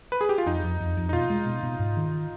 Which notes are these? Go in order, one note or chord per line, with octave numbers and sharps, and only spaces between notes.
B4
G#4
G4
F4
F2 D#4
F2
F2
F2
D#4
B2 F4
G#3
B2
B2
G#2
D#3